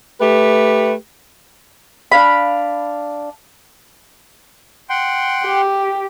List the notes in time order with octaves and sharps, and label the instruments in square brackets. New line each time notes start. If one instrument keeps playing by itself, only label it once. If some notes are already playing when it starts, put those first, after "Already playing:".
[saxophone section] A3 G4 B4
[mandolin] D4 F5 B5
[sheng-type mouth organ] F#5 G5 C6
[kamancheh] G4